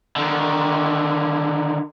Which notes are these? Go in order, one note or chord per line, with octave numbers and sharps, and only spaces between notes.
D3 D#3